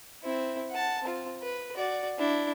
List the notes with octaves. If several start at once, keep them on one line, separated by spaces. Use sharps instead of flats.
C4 E4
F#5 A5
C4 F4
B4
F#4 D5
D4 E4